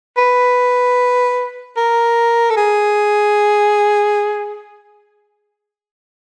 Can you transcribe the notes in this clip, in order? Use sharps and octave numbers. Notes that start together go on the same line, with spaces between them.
B4
A#4
A4
G#4